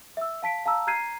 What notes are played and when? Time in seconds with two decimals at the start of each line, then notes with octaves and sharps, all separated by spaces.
0.17 E5 E6
0.42 F5 A5 B6 D7
0.66 F5 A5 A#5 E6
0.87 A#5 F6 G6 G#6 C7 D#7